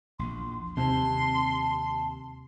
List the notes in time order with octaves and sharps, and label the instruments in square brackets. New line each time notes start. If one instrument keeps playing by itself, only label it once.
[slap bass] A#1 E2 [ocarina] C6
[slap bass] D#2 [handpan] C3 [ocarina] A5 [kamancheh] C6